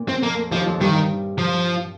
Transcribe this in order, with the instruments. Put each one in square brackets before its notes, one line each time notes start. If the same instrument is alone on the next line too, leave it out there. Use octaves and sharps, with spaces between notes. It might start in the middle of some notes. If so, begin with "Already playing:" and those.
Already playing: [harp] A#2
[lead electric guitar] C4
[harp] F2 [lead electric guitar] A#3
[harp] D#2 D#3 [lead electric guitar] F3
[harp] F2 F3
[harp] G2 G3 [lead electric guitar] D#3
[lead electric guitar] F3